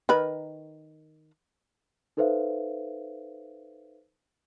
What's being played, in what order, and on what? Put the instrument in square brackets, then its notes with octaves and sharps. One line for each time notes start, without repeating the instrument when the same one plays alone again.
[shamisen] D#3 A#4 B4
[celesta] D#4 A4 B4 C5 E5 F5